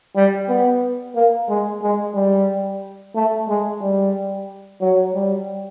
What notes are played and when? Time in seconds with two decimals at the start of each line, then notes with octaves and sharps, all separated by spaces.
0.16 G3
0.49 B3
1.15 A#3
1.49 G#3
1.82 G#3
2.15 G3
3.15 A3
3.48 G#3
3.81 G3
4.81 F#3
5.14 G3